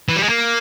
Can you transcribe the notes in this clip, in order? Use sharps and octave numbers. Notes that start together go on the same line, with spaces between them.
E3
G3
G#3
A#3